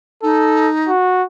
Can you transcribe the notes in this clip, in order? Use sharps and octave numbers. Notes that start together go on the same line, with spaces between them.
D#4 A4
F#4